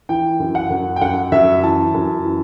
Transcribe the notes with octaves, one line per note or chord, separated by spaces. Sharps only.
E3 G5
F#2
F#5
F#2
G5
F#2 F#5
F#2 E5
E3 A5
F#2
E3